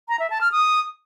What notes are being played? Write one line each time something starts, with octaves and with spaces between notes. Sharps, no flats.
A#5
E5
A5
F6
D#6